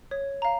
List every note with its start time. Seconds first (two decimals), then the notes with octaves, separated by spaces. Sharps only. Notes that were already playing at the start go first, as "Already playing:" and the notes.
0.11 C#5
0.42 F5 A#5